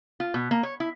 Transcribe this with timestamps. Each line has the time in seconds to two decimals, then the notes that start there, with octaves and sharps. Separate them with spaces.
0.20 F4
0.34 B2
0.51 A#3
0.63 C#5
0.80 E4